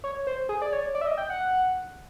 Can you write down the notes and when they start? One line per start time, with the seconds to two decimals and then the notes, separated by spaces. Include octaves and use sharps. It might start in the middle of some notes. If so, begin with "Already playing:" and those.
0.04 C#5
0.27 C5
0.49 G#4
0.62 D5
0.73 C#5
0.95 D5
1.01 E5
1.07 D#5
1.17 G5
1.30 F#5